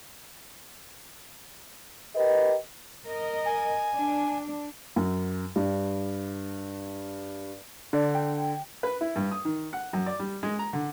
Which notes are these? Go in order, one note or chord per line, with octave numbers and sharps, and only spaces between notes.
G4 A#4 B4 D#5
A#4 D#5
G#5
D4
F#2
G2
D3 D4 D5
G5
B4
E4
G2
D#6
D#3
F#5
F#2
D5
G3
G#3
A#5
D3